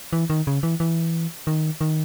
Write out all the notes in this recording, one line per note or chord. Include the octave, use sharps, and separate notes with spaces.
E3
D#3
C#3
E3
E3
D#3
D#3